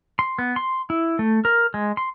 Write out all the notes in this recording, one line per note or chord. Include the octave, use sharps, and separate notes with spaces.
C6
B3
C6
E4
A3
A#4
G#3
C6